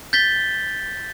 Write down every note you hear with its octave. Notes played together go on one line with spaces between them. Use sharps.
G6 A6 B6 G7